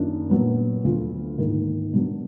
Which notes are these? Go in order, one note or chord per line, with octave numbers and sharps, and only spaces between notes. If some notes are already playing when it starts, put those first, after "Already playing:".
Already playing: F#2 D#3 A#3 D4 F4
A#2 F#3 B3
D2 D3 F3 B3 F4
G#2 D#3 A#3
B2 F#3 D4